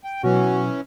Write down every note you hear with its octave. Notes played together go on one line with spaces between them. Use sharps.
G5
B2 E3 F#3 C#4 F#4